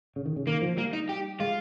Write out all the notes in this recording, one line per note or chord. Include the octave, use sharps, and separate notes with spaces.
C#3
D#3
C#3
D#3 A#3
F3
G3 A#3
D#4
G4
G#3 F4